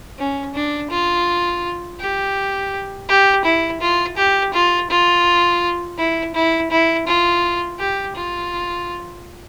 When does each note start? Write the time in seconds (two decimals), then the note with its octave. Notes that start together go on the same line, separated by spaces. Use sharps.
0.18 C#4
0.55 D4
0.91 F4
2.00 G4
3.09 G4
3.45 E4
3.81 F4
4.17 G4
4.54 F4
4.90 F4
5.98 E4
6.35 E4
6.71 E4
7.07 F4
7.79 G4
8.16 F4